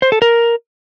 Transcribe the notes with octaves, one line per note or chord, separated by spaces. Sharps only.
C5
A4
A#4